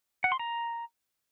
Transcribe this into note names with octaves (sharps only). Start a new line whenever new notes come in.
F#5
C6
A#5